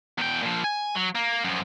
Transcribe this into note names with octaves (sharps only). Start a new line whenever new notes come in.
E2 G5
A#2 F3
G#5
F#3
A#3
F#2 F3